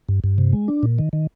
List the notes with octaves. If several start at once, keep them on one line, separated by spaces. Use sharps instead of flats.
G2
G2
C3
G#3
D4
A#2
D#3
D#3